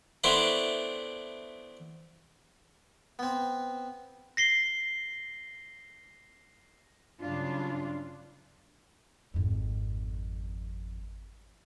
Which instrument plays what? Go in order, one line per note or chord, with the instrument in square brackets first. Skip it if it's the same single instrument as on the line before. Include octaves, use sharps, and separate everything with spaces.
[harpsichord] A3 B3 C4 D4 E4
B3 C4
[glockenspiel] A#6 C7 G7
[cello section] G2 C#3 F#3 D4 F4
[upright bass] G#1 F2